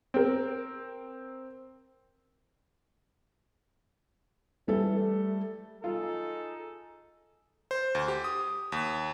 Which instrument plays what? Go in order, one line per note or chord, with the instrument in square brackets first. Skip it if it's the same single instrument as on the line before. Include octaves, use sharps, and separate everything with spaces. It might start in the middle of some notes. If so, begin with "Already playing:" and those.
[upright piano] C4 A#4
[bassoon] E3 [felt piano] G3 A4
[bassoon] A3
[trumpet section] D#4 G#4 A4 [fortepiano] F4
[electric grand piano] C5
D2
G4
D#6
D#2